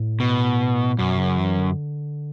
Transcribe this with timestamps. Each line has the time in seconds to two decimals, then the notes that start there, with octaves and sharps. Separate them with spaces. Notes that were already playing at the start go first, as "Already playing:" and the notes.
Already playing: A2
0.20 B2
0.98 F#2 B2
1.18 C#3
1.38 E3
1.58 D3